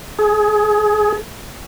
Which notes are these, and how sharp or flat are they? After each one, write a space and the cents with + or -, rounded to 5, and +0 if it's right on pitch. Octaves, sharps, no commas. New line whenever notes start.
G#4 +25